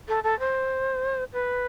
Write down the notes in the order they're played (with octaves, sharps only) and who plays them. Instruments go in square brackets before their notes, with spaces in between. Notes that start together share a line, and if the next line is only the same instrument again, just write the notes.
[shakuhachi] A4
A4
C5
B4